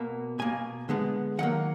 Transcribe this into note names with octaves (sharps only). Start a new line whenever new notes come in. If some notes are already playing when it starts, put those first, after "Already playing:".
Already playing: B2 A#3
B2 A#3 G#5
D3 G#3 B3
D#3 F#3 A#3 F#5